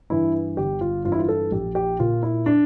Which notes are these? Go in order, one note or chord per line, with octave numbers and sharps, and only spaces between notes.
G2 E3 E4
G1 G4
F4
G2 E3 E4 F4
F4
A4
A#1 G4
G4
A#2 F4
E4
D4